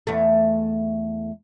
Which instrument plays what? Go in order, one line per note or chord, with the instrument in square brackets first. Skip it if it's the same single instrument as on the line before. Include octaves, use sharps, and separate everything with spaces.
[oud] E2 A3